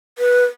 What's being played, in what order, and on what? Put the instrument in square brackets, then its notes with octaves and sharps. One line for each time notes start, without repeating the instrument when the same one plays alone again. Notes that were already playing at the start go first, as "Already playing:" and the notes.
[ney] B4